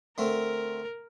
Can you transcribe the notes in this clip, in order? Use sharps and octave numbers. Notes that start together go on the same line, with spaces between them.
D3 A3 C4 A#4